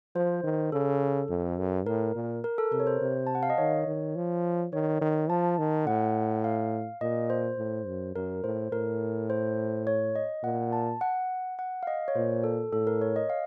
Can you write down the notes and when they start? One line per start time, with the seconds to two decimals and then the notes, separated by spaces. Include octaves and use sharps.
0.15 F3 C5
0.44 D#3
0.72 C#3 A4
1.30 F2
1.59 F#2
1.87 A2 A#4
2.15 A#2
2.44 A#4
2.58 A4
2.72 C3 A#4
2.80 C#5
2.87 C5
3.01 C3
3.27 A5
3.35 F#5
3.43 F5
3.50 D#5
3.58 D#3 C#5
3.87 D#3
4.16 F3
4.73 D#3 C#5
5.01 D#3
5.29 F3 A5
5.58 D#3
5.87 A2 F#5
6.44 F5
7.01 A#2 D#5
7.30 C5
7.58 A2
7.87 F#2
8.15 F#2 A#4
8.44 A2 C5
8.72 A2 A#4
9.30 C5
9.87 C#5
10.16 D#5
10.44 A#2 F#5
10.73 A5
11.01 F#5
11.59 F#5
11.83 F5
11.87 D#5
12.08 C#5
12.15 A#2 C5
12.44 A4
12.73 A2 A4
12.87 A#4
13.01 C#5
13.16 D#5
13.30 F5